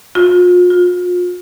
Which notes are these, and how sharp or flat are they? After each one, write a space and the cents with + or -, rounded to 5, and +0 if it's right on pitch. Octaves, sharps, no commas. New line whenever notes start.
F4 +40
F4 +30